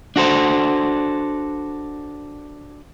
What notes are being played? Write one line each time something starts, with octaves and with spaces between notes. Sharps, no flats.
D4 F#4 A4 C5